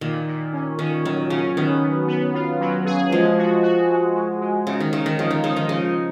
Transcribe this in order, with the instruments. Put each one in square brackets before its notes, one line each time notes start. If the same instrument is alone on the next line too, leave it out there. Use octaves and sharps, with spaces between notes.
[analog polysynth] A#2 [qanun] D#3
[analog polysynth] A#2
C#4
[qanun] D#3 [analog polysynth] C#4
[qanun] D#3 [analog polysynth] F#3
[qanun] C#3 [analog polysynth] C#4
[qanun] D#3 [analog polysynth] B3
[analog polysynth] B3
B3
F4
F#3
G#4
[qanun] F3 [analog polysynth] G#3
[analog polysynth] F#4
F#4
G#3
G#3
G#3
[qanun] C#3 [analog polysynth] D#4
[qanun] D#3
[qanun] C#3 [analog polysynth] D#4
[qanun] D#3
[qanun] C#3 [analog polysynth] F3
[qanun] D#3
[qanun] C#3 [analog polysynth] D#4
[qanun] D#3
[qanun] C#3 [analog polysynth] D#4